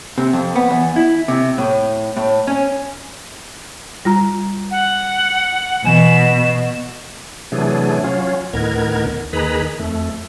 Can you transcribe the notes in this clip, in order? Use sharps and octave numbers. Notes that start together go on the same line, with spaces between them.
C3
F2
B3
E2
E4
C3
A2
A2
C#4
G3 F4 A#5
F#5
B2 E3 G#5 E7
C3 E3 F#3 A3 D4 G#4
F#3 C#4 F4
D2 A2 D#3 B3 A#4 G#6
D#2 D#3 G#4 B4 A#5 B5
F2 A3